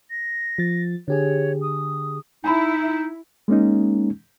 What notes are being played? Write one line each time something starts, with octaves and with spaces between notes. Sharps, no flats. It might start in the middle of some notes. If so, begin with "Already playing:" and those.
A#6
F3 A6
D3 G4 G#4 C#5
D#6
D#4 E4 G#5 A#5 B5
G#3 A#3 C#4 D#4